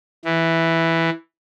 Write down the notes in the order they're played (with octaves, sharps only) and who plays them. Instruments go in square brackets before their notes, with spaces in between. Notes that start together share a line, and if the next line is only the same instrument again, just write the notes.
[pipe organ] E3